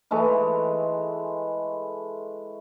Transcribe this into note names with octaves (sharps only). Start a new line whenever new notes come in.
E3 G#3 A3 B4